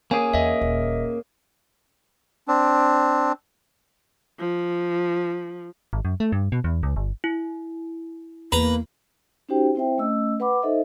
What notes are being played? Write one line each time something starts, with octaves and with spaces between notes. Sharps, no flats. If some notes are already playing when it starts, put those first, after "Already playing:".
A#3 C#4 G#4 G#5
E2 D#5 E5
D#1
C4 D4
F3
G#1
F#2
A3
G2
B2
E2
C#2
G1
E4
E2 A#3 B4 A#5
C#4 D#4 F#4 G4 C5 G5
C4 E4 C5 E5 G5
A3 C#4 D#5 E6
B4 F#5 B5 D6
D#4 A4 C5 D#5 E5